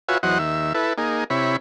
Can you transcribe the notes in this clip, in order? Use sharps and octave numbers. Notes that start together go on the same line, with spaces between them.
F4 F#4 B4 C#5 E5 G#5
E2 F#3 C5 D#5 F#5
D#2 E5
E4 A4 B4
A#3 D#4 G#4
C3 E4 C#5 B5